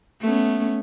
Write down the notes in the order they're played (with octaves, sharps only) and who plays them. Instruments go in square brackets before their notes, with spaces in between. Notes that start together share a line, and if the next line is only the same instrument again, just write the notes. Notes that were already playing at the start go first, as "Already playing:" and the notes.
[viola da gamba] A3 B3 C#4